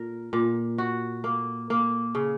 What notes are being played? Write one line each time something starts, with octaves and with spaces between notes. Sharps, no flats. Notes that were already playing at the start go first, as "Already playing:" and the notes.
Already playing: A#2 A#4
A#2
F#4
A#3
A#3
C#3